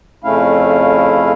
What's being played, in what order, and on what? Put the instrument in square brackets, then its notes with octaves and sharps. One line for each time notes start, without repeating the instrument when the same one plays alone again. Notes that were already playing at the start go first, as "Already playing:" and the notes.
[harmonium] F2 C#3 A3 C#4 E4 F5